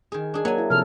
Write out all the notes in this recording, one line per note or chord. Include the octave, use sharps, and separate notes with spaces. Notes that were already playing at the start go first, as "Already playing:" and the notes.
D#3 G#4
D4 G#4
F#3 A#3 G#5
E4
C3 F3 A4 F6